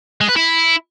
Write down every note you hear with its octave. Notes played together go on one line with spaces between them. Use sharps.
G#3
B4
E4